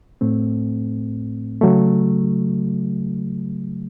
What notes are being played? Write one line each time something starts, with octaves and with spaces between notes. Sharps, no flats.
A2 A3 C4
C#3 F#3 A3